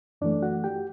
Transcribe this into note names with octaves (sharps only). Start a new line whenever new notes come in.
F#2 E3 A3 D4 D5
F#4 F#5
G4 G5